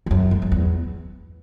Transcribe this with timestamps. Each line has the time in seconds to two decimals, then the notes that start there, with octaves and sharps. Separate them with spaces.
0.06 E2
0.11 F#2
0.31 G#2
0.42 F#2
0.52 E2